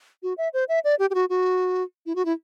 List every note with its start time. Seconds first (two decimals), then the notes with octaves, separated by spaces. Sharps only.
0.23 F#4
0.38 E5
0.54 C5
0.69 E5
0.84 D5
0.99 G4
1.10 G4
1.15 F#4
1.30 F#4
2.06 E4
2.15 F#4
2.25 E4